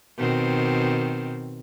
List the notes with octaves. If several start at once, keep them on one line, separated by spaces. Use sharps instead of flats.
B2 D#3 C4